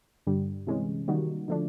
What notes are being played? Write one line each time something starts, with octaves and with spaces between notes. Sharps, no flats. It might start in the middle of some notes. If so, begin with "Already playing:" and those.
G2 D3 G3
C3 E3 G#3 C#4
D#3 G3 A#3 D#4 F#4
D3 F3 A3 D4